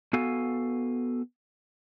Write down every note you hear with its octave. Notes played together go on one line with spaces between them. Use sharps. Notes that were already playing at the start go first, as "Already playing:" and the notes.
B3 F#4 A4 F5 G#5